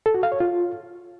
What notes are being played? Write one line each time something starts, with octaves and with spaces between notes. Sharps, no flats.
A4
F#4
F5
C#5
F4